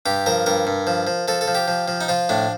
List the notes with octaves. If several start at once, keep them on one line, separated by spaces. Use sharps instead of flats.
G2 G4
F3 A#4
G2 A#4
G2
F3
F3
F3 A4
A4
F3
G4
F3
F3
D#4
F3 F4
A2 D4